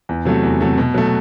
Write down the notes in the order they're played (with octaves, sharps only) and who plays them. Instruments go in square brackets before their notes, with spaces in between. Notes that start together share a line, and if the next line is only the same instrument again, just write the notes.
[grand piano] E2
C3 F#3 A3
E2
C3 F#3 A3
B2
F#3 A3